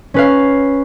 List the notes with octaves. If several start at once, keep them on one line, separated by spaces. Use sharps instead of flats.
C#4 B4 F5